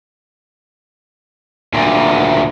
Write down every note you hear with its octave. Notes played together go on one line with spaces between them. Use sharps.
D2 A#2